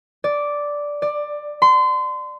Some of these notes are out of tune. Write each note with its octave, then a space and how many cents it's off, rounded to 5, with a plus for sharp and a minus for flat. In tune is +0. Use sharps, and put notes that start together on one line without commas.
D5 -5
D5 +15
C6 -30